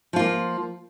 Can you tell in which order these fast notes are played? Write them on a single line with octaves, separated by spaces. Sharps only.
F3 F4 A#3